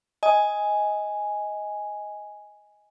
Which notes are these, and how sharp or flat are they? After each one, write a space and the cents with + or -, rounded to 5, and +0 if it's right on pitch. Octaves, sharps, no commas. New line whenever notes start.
D#5 +15 G#5 +0